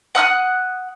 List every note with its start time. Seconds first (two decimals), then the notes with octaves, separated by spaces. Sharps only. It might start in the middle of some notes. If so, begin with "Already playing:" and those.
0.15 F#5 D#6 F6 F#6